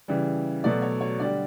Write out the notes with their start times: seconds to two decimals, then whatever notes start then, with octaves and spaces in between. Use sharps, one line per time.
0.08 C#3 E3 G3
0.64 B2 F#3 A3 D5
0.82 C#5
1.01 C#5
1.20 D3 G3 D5